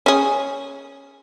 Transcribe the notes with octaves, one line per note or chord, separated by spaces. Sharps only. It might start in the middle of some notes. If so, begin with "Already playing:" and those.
C#4 G#4